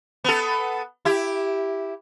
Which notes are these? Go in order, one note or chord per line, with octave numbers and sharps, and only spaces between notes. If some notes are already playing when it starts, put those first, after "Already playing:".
B3 A4
E4 G4